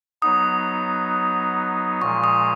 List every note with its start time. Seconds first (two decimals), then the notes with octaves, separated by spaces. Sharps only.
0.22 F#3 B3 D#4 D#6
2.01 A#2 F3 G#3 C#6
2.24 D#6